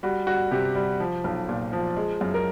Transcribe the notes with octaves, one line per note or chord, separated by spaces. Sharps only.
G3 F#4
G3 F#4
C3 G4
G3
F3
B1
A#2
F3
G#3
F#2
A#4